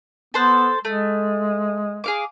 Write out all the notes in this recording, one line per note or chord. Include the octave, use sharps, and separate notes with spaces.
B3 A4 C5 F#6
G#3 A3
G#4 F5 D6